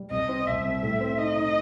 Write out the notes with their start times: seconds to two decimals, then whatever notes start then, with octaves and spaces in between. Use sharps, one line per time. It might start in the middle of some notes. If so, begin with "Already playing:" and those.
Already playing: G3
0.11 C2 D#5
0.29 C4
0.46 C2 E5
0.65 C2
0.83 A2
1.00 C4
1.18 D#4 D#5
1.36 D#4